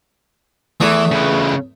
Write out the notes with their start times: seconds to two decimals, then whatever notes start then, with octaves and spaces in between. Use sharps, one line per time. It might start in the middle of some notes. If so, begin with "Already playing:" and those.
0.80 E2 E3 A3
1.11 C#3 B4